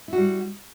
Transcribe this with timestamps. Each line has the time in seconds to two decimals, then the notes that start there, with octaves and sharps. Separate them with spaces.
0.08 E4
0.13 F#4
0.17 G3